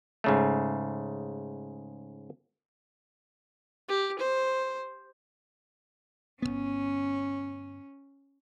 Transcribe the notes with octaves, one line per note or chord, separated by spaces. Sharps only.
G#2 C#3 A3
G4
C5
G1 F2 B3 C#4